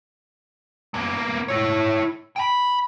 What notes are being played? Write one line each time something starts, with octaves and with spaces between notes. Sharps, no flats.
A#3 B3
E4 C#5
G5 B5